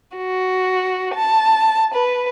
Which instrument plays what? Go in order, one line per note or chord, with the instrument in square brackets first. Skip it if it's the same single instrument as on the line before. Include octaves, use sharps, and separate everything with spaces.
[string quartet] F#4
A5
B4